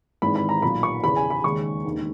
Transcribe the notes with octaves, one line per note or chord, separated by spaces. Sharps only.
G#1 G#2 E3 B5
B5
A#5
B1 A#2 A#3 B5
C#6
E2 C#3 E3 B5
G#5
B5
D#2 C#3 G#3 C#6
E1 D#2 D#3